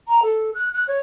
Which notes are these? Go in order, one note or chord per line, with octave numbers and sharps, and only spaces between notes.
A#5
A4
F#6
F#6
C#5